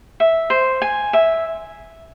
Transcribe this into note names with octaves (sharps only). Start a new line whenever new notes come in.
E5
C5
G#5
E5